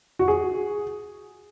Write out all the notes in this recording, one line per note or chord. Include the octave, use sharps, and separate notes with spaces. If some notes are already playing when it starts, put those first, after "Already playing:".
F#4
G#4